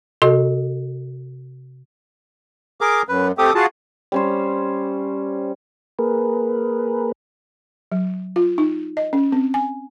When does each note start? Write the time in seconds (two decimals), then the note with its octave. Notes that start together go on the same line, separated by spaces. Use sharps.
0.22 C3 F#4 A4 D#5
2.81 G#4 A#4 D6
3.09 F#2 B4
3.38 A3 C4 G4 A4 D6 D#6
3.55 F4 F#4 G#4 A5
4.12 G3 C#4 C5
5.99 A#3 G#4 A#4 B4
7.92 F#3
8.36 F4
8.58 D#4
8.97 D#5
9.13 C#4
9.32 C4
9.54 G#5